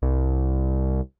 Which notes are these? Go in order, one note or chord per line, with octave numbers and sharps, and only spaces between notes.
C2